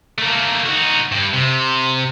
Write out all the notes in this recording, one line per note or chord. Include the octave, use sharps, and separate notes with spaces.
A3 A#3
D#4 F#4
G2
C3